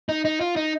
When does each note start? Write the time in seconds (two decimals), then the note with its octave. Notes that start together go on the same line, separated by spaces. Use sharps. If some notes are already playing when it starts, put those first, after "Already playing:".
0.09 D#4
0.25 D#4
0.41 F4
0.56 D#4